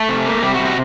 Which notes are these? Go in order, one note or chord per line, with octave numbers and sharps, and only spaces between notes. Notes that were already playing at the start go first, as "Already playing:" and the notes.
Already playing: A3 A4
C3
A#3
C3 G3 G4
F#4
G3
F#4